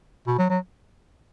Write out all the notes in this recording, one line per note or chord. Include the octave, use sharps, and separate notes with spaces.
B2
F#3
F#3